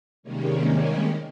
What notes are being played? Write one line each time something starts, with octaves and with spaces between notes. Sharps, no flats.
C3 D#3 G3 G#3 A#3 C#4